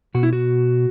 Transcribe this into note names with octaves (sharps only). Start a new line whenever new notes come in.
B2 F#4
E4
F#4